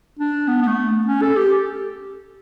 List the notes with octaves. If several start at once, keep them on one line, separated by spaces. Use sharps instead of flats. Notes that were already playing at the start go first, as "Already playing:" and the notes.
D4
B3
B3
A3
C#4
A4
G4